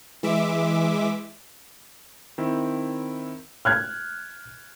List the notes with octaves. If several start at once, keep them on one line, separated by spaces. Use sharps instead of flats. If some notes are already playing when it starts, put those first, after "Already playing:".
E3 G#3 E5 D6
D#3 C4 E4
F6 F#6 G#6